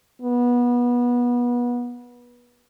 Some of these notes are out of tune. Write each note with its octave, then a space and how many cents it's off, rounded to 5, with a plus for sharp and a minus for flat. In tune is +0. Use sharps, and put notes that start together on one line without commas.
B3 -25